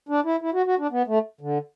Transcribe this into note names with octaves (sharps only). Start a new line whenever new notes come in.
D4
E4
E4
F#4
F#4
D4
B3
A3
D3